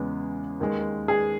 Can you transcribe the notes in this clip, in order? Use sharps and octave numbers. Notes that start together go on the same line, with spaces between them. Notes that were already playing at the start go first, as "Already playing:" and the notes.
Already playing: E2 C#3 G#3 B3
D#2 D#3 G#3
G#4